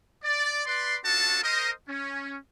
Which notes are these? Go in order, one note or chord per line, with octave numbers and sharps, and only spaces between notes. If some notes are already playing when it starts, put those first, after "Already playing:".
D5
B4 D5 C6
C#4 D4 F4 F#4 A4 A5
A#4 C5 D#5
C#4